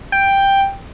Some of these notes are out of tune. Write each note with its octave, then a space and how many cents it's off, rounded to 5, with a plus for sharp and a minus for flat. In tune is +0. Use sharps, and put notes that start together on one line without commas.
G5 +5